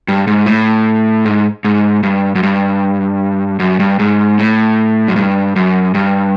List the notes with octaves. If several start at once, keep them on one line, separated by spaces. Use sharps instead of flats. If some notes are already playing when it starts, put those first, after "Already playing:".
G2
G#2
A2
G#2
G#2
G2
F#2
G2
F#2
G2
G#2
A2
F#2
G2
F#2
G2